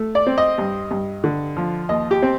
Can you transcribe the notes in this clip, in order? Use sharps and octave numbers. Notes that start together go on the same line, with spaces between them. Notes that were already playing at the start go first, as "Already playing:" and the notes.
Already playing: A3
D5
C4
D#5
G2
G2
D3
F3
D#2 D#5
G4
C4